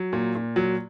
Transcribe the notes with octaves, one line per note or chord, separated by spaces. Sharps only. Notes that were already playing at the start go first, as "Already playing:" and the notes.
Already playing: F#3
A#2
A#2
F#3